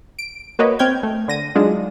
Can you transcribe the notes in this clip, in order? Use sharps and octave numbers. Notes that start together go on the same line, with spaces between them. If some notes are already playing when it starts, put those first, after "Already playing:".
D7
A#3 F#4 B4 C#5 D#5
C4 G5 F6 G6 G#6
A3
D3 A#6 D#7
F#3 G#3 D4 D#4 F4